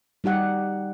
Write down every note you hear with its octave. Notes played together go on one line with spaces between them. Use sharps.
G3 D#4 G4 F#5